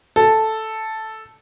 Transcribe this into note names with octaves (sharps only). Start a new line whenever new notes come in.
A4